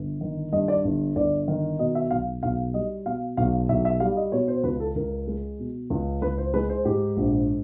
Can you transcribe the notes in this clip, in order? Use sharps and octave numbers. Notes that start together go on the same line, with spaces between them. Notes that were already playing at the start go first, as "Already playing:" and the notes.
Already playing: G1
D#3
G2 D#5
D5
G1
G1 D5
D#3
B2 D#5
E5
B1 F5
B1 F5
G3 D#5
B2 F5
B1 F5
B1 E5
E5
G3 F5
D#5
B2 C#5
C5
C#2 B4
A4
C#2 A#4
G#3
B2
C#2
C#2 B4
C5
G#3 B4
C5
G#2 G4
A#1